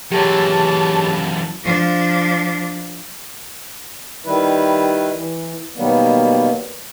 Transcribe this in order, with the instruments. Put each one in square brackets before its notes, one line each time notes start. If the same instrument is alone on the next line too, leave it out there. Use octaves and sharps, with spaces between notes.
[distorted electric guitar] F#2 E3 [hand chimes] G4 G#4 C#5 [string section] A5
[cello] F3 D4
[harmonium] D#3 G3 E4 B4
E3
B2 D#3 F#3 G3 A#3 B3